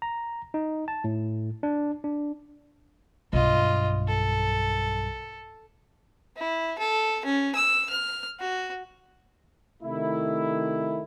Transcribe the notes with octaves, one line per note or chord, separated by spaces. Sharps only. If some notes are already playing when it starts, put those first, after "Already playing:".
A#5
D#4
A5
A2
D4
D4
B1 G2 F4 D#5
A4
E4
A4
C#4
E6
F6
F#4
C3 D#3 A3 E4